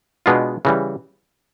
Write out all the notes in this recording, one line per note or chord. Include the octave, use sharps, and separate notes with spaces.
B2 G#3 B3 D4 F4
C#3 E3 G3